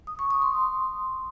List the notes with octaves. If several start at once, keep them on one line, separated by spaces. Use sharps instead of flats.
D#6
C#6
D#6
C6